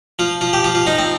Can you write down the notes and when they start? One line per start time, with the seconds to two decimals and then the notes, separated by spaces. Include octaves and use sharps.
0.19 F3 F4
0.41 F3 F4
0.53 G4
0.64 F3 F4
0.75 F4
0.86 F3 D#4
0.98 C4